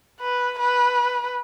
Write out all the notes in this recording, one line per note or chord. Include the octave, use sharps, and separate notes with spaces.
B4
B4